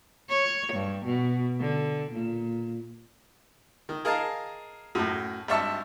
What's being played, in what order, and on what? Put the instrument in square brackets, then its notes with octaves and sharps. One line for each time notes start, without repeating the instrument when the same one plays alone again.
[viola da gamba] C#5
G2
B2
D3
A#2
[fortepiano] D#3
G#4 A#4 D#5 F5 A5
F#2 A2
G#1 G2 E5 A5 C#6 E6